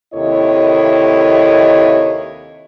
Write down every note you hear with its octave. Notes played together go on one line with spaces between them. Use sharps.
D#2 C3 E4 A4 C#5 D#5